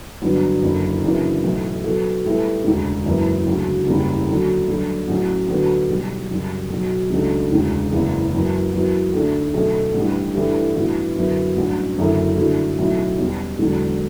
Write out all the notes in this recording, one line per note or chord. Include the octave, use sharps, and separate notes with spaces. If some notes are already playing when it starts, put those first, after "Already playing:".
G1 G2 F#3 B3
F#1 F#2 D3
F#2 C#3 E3 B3 D4
B1 A2 E3
B2 F#3 B3 F#4 A4
A2 G3 B3 E4 A4
E1 D2 C#3
F#1 F#2 E3 B3
D2 C#3 F#3
F#1 E2 C#3 G3 C#4
D2 D3 F#3
G2 F#3 A3
A1 A2 F#3 C#4
D2 D3 F#3 B3
B1 B2 G3
F#2 C#3 G3
B1 B2 F#3
C#2 C#3 F#3 A3 D4
E1 D2 C#3
F#1 E2 C#3 E3
F#2 E3 B3
F#2 E3 B3 F#4
D2 D3 A3 D4
B1 B2 A3 C#4
A1 G2 E3 G3
G2 E3 A3 E4 G4
A1 G2 E3 B3 F#4
F#2 D3 F#3 B3 E4
A1 G2 F#3 C#4
F#1 F#2 D3 A3 E4
G2 D3 F#3 A3 E4
B1 A2 F#3 C#4 E4
E2 B2 G3 C#4
E1 E2 D3 F#3